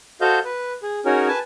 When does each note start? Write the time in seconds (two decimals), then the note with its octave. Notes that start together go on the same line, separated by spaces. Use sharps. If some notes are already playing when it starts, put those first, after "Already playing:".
0.21 F#4 A4 C5 D#5 F5 G6
0.45 B4
0.83 G#4
1.05 C#4 D#4 F#4 G#4 A#4 C#5
1.28 B4 G#5 A5